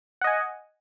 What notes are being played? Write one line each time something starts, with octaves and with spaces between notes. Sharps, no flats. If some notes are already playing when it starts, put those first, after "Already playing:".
D#5 F#5 G#5